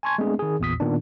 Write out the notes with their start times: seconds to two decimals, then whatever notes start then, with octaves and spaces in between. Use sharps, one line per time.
0.03 G#5 A5 C6 C#6 G#6
0.18 G#3 A3 B3 C4 D4 G#4
0.39 D#3 G#4
0.60 A1 E2 A#2 D#6 B6
0.80 A#2 D#3 B3 D4